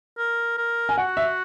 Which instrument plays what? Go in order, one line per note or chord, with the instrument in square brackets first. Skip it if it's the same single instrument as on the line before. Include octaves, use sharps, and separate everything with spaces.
[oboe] A#4
A#4
[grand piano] G#5
[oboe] F#4 [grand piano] F#5
[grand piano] E5